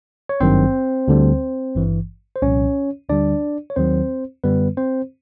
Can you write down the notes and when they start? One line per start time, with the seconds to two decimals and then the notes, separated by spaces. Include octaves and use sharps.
0.29 C#5
0.41 G#1 G2 D#3 F#3 C4 C5
1.08 D2 D3 G3
1.75 G#1 G2 E3
2.36 C5
2.42 C2 A#2 F3 C#4 C#5
3.09 D2 D3 G3 D4 D5
3.70 C#5
3.76 D#2 D#3 F#3 C4 C5
4.44 F#2 D3 G3 B3 B4
4.77 C4 C5